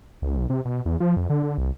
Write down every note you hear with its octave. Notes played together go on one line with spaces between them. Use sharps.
C#2
B1
C3
B2
E2
F3
F2
D3
D3
C2